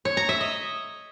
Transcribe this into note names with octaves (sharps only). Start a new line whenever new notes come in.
C#5
A#5
E5
D#5